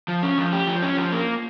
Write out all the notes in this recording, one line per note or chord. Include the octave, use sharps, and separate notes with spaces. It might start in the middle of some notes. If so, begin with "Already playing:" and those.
F3
C#4
F3
G4
F3
C#4
F3
A#3